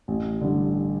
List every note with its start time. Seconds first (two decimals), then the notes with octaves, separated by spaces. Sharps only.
0.08 A1
0.41 G2 D3